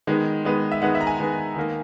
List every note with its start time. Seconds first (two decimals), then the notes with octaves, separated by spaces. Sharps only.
0.07 D#3 G#3 B3
0.45 D#3 G#3 B3
0.71 E5
0.82 D#3 G#3 B3 F#5
0.95 E5
1.01 A#5
1.07 G#5
1.19 D#3 G#3 B3
1.56 D#3 A#3